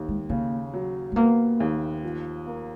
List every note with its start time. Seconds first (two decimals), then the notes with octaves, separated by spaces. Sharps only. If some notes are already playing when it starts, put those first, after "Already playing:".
Already playing: D#2
0.08 G#3
0.29 C#3 A#3
0.73 F#3
1.12 G#3
1.16 A#3 B3
1.60 D#2
2.03 F3
2.46 A#3